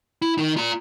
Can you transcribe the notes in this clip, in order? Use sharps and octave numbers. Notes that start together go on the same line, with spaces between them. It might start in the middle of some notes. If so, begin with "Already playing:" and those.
E4
D#3 D#4
F4 A#5